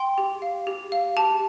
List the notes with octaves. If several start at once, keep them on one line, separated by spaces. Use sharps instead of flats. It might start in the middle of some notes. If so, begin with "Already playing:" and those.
Already playing: G5 C6
G4
F5
G4
F5
G4 A5